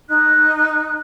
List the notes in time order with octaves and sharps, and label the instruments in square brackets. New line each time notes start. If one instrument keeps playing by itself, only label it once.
[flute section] D#4 F#6